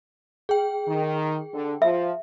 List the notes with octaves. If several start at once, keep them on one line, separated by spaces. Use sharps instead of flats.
G#4 G5
D#3
D3
F3 E5